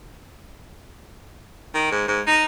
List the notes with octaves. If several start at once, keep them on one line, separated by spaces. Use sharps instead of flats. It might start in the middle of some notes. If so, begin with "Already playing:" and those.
D#3
G#2
G#2
D#4